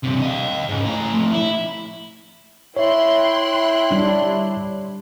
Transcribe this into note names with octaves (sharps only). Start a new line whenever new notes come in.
G2 C3
D#5 F5
G#2 C#3
A2 A#5
F3 A3
E4
E4 C#5 E5 G5 C6 F#6
G3 D4